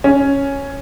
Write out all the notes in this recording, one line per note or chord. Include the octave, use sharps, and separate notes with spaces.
C#4